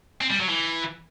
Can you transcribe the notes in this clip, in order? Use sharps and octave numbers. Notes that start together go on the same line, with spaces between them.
C4
G3
F#3
E3